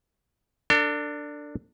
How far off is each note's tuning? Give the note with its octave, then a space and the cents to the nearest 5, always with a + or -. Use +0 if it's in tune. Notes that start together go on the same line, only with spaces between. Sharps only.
D4 +0 A4 +45